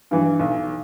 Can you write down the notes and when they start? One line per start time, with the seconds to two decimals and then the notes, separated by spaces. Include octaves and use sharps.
0.11 G2 E3
0.39 B1